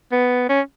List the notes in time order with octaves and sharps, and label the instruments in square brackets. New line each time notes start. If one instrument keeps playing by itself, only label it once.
[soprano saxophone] B3
C#4